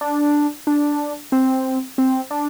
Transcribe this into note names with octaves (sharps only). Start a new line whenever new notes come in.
D4
D4
C4
C4
D4